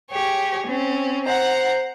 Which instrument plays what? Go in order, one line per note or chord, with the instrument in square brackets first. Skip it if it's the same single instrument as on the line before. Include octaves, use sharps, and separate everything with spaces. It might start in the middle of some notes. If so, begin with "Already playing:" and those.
[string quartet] G4 G#4 C#5
C4 C#4
[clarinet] C5 [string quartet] F#5 A#5